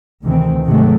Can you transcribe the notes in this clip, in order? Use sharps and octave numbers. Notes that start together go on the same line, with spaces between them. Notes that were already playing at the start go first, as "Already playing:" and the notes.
D2 C3 D#3 E3 C4
G#2 C3 D#3 F#3 G#3 A3